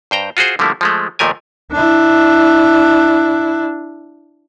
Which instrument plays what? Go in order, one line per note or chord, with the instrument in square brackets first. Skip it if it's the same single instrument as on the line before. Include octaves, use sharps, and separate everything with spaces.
[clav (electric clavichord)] G2 C5 G5 A#5
F4 F#4 G#4 C5
D3 F3 G3 A3 A#3 E4
F3 G#3 A3
D#2 A#2 F3 A3 A#4 G#5
[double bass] D4 E4